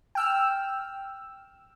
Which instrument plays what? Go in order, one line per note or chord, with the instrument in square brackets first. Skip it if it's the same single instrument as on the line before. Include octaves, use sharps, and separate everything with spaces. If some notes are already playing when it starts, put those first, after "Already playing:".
[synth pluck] G5 E6 F6